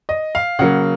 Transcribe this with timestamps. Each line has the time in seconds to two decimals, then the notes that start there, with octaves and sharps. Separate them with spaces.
0.09 D#5
0.35 F5
0.59 C#3 F#3 A#3 F#5